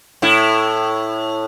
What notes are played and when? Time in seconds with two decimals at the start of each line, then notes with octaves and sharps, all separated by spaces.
0.22 A2 E4